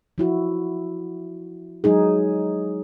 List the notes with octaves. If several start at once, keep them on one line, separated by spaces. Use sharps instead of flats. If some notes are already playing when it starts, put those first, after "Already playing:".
F3 E4 F#4
F#3 G#3 D#4 G#4